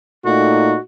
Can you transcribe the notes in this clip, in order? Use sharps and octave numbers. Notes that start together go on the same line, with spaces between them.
A#2 A3 D#4 F#4